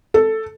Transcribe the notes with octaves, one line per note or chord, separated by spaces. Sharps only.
A4